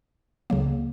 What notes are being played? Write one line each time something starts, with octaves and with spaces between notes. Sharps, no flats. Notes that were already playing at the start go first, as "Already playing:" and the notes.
C#2 C#3 F#3 A#3